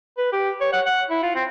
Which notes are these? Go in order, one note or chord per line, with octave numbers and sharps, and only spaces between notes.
B4
G4
C#5
F#5
F#5
E4
F4
C4